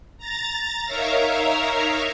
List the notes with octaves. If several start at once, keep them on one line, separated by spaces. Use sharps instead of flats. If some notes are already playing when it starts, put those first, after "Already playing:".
A#5 A6
D#4 A#4 C#5 E5 F5 A#5